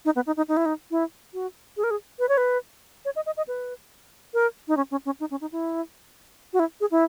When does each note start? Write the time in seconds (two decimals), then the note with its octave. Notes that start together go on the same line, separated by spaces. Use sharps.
0.05 D#4
0.16 B3
0.26 D#4
0.37 D#4
0.48 D#4
0.57 E4
0.65 D#4
0.91 E4
1.34 F#4
1.77 G#4
1.84 A#4
1.91 G#4
2.19 B4
2.29 C#5
2.37 B4
3.05 C#5
3.16 D#5
3.26 D#5
3.37 D#5
3.48 B4
4.34 A#4
4.68 D#4
4.77 C#4
4.91 C#4
5.05 C#4
5.20 D#4
5.31 C#4
5.41 D#4
5.52 E4
6.53 F#4
6.59 E4
6.80 G#4
6.91 E4